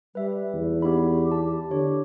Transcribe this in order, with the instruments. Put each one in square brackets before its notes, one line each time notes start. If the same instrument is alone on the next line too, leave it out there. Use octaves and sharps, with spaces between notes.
[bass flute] G3 [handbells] B4 E5
[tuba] E2
[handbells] B3 D#4 B5 [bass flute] G4
[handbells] A5
[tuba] D3 [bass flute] G4 [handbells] C#5